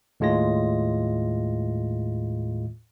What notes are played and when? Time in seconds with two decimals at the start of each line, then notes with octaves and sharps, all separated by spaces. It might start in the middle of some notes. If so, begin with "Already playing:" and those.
0.20 D#2 A2 G#3 F4 A#6